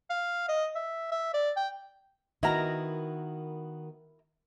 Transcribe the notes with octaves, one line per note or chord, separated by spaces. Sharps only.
F5
D#5
E5
E5
D5
G5
D#3 B3 E4 F#4 A#4 A#5